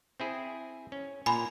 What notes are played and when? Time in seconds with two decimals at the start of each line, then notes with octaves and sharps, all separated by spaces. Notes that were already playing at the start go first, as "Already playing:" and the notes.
0.20 C4 E4 G#4
0.92 C#4
1.26 A#2 G#5 A#5 B5